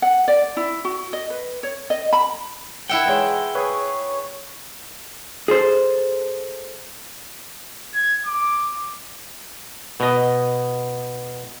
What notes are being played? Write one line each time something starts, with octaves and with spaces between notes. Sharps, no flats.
F#5
D5
E4
F#4
D#5
B4
C#5
D#5
B5
E4 E5 F#5 G5
E3 G#3 C#5
G#4 B4 C#5
G#4 A4 C5
G#6
D6
B2 D#5